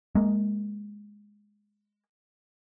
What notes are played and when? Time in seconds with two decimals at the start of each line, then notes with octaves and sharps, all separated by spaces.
0.15 G#3 A#3